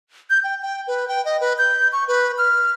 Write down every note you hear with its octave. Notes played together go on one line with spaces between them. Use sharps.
G6
G5
G5
B4
G5
D#5
B4
G6
C#6
B4
F6